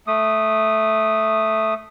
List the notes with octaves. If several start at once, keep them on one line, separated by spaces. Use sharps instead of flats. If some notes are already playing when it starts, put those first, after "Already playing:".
A3 D#6